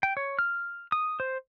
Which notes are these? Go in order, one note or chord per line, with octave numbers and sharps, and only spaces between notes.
G5
C#5
F6
D#6
C5